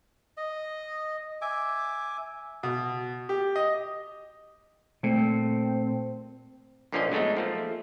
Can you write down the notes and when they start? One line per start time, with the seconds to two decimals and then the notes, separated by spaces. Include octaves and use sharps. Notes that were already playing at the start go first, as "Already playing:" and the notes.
0.37 D#5
1.42 E5 G#5 D6
2.63 B2
3.29 G4
3.56 D#5
5.03 A#2 A3 C4
6.92 A#1 D3 F3 A#3 C#4 D#5
7.12 F#3 G#3 A3 B3 D#4
7.37 F3 A3 A#3